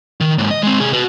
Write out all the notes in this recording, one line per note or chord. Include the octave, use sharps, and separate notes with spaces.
D#3
D#2 G#2
D#5
G#3 C4
C3 G#4
F#4 B4